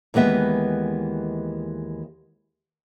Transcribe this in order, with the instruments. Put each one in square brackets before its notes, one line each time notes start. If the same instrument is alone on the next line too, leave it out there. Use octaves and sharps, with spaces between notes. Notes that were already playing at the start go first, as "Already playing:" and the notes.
[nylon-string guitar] D#2 E3 G#3 B3 E5